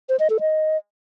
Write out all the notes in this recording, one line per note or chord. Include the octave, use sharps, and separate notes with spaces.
C5
D#5
A4
D#5